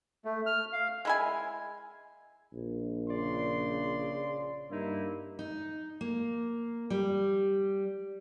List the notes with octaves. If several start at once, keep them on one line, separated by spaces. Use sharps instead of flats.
A3
F6
F5
G#3 E4 G#5
A#1
C#3 D5 C6
G2 A#3 D#4 E4
D#4
A#3
G3